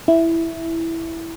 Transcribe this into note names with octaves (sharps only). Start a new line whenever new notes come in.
E4